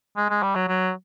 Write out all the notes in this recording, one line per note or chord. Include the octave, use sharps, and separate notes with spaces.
G#3
G#3
G3
F#3
F#3